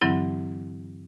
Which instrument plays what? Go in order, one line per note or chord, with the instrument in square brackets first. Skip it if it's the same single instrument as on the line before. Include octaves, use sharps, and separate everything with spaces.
[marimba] G2 D3 E3 F#3 C4 E4